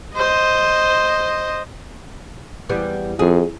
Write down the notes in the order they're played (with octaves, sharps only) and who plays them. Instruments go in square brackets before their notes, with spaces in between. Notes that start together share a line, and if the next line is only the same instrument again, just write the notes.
[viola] C5 D#5
[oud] E2 G3 B3
[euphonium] F2 [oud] G#4